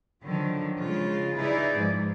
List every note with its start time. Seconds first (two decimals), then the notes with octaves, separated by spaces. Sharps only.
0.22 D3 D#3 F3 F#3
0.77 C#3 G#3 F4
1.36 D#4 E4 G#4 B4 D5
1.76 G#2 F3